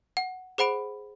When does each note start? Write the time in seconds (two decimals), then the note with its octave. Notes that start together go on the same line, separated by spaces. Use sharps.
0.17 F#5
0.58 G#4 C5 F#5 B5 D7